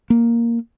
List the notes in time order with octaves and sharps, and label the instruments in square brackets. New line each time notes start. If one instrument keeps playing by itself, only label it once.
[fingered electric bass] A#3